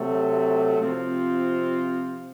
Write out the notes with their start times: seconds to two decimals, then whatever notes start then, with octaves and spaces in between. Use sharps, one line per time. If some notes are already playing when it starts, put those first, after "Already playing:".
Already playing: C3 F#3 A3
0.78 C3 F3 C4 F4